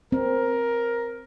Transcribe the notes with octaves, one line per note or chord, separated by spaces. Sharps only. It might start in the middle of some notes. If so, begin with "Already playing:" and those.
C4 A#4